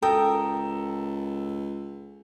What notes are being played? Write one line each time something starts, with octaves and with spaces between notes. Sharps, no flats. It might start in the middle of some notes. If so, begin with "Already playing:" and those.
C#2 A4 A#4 G5 D#6